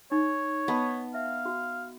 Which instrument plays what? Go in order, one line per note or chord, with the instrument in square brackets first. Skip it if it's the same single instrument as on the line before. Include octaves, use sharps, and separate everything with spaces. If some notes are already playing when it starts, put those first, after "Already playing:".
[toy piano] D#4 [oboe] C#5
[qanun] B3 [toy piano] D#5 A5 B5
[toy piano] E5 [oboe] F5
[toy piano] F#4